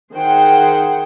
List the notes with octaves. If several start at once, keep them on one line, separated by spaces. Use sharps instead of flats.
D#3 G#4 C5 F#5 G5